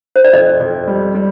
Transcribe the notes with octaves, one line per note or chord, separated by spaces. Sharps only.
C5
D5
F2 D#5
F2
G3
G3